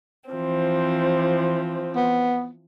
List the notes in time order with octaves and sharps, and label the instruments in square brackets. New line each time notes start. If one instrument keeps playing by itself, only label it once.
[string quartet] E3 F3 C4
[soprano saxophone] B3